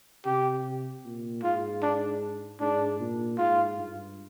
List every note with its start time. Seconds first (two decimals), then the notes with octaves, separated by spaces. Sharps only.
0.26 C3 G4
1.05 A#2
1.43 G#2 F4
1.83 D4
2.60 G#2 D4
3.00 A#2
3.38 G#2 F4
3.78 G2